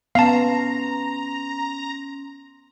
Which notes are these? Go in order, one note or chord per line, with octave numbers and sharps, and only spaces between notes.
B3 C#4 F5 A5 A#5 C6